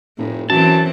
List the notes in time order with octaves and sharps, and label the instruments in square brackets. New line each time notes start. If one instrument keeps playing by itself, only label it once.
[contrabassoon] F1 [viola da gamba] A2
[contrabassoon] F#2 [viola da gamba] E3 C4 [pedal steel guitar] A5